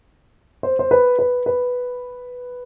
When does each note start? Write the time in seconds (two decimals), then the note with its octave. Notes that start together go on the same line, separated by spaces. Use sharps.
0.63 C5
0.79 C5
0.91 B4
1.19 B4
1.46 B4